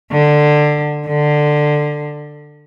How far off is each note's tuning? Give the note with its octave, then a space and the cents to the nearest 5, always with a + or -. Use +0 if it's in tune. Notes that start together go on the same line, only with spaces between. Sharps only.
D3 +15
D3 +15